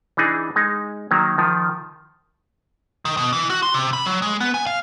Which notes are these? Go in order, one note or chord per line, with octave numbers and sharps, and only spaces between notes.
E3 D4 D#4 G#4
G#3 D#4
D#3 F#3 A#3
D#3 F3
D#3
B2
E3
F#4
C6
C3
B5
F#3
G#3
B3
G#5
F5